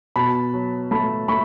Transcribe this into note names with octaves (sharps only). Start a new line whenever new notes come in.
B2 A5 B5
F#3
A3 A5 B5
A3 B5 C#6